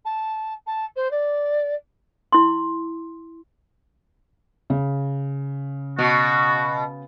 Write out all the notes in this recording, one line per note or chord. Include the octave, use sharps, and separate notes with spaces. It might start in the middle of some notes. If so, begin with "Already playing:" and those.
A5
A5
C5
D5
E4 C6
C#3
B2 F#4